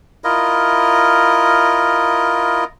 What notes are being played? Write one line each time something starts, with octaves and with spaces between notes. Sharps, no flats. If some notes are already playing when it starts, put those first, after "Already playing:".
E4 F4 A#4 D#5